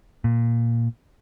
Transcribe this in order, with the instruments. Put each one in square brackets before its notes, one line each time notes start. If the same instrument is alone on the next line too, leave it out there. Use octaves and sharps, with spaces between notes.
[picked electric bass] A#2